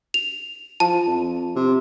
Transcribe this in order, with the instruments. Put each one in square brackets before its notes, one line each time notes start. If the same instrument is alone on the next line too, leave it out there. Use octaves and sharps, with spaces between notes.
[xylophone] F7
[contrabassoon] F3 [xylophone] A5
[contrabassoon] F2
C3